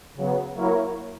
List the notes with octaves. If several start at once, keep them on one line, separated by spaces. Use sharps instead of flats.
C#3 F#3 B3
F#3 A#3 E4 A#4 C#5